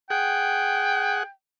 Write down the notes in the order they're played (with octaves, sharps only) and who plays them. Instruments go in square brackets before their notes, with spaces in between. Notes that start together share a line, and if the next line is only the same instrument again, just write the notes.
[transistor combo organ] G#4 F#5 [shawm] G5